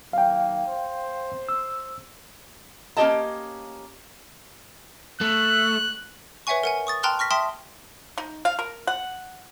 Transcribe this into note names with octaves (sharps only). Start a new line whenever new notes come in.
D#3 F#3 A#3 F5 G5
C5
E6
A#3 C#4 F#4 G4 D#5 A5
A3 F#6
B4 C#5 E5 F#5 G#5 C#6
A#4 F#5 G#5
C#6 D#6 A6
G5 A5 A#5 C6 F6 F#6
C#6 F6 A#6 B6
E5 G5 A5 C6 D#6 B6
D#4
F5
A#4
F#5